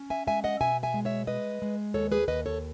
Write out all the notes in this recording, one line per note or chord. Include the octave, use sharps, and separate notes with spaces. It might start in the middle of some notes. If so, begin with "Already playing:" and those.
Already playing: C#4
E5 G#5
G#3 E5 G#5
D#5 F#5
B2 E5 G#5
E5 G#5
G#3
C#5 E5
G#3 B4 D#5
G#3
D#2 A4 C#5
G#4 B4
D#2 B4 D#5
A4 C#5